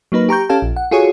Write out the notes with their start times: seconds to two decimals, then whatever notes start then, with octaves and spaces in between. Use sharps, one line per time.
0.12 F#3 A#3 D#4 B4
0.29 G4 A#5 C#6 G6
0.49 C#4 G4 A4 F5 A5
0.62 A#1
0.76 F#5
0.91 F4 F#4 G#4 A4 C#5 F#5